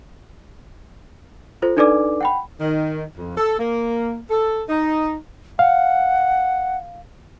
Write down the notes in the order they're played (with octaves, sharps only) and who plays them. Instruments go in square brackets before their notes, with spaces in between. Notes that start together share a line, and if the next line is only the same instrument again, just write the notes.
[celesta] F4 A4 C5
D4 D#4 A4 B4 D5 D6
F#5 G5 B5
[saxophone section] D#3
F2
A4
A#3
A4
D#4
[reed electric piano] F5 [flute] F#5